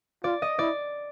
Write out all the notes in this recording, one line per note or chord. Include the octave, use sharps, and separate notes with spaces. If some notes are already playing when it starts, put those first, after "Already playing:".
F4 D5
D#5
E4 D5